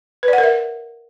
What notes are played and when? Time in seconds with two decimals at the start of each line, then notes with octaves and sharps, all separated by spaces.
0.23 B4
0.28 D5
0.33 F#5
0.38 A#4
0.43 E5